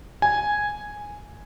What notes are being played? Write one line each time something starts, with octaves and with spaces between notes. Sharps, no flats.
G#5